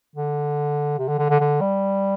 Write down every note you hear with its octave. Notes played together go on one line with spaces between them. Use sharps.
D3
C3
D3
D3
D3
D3
G3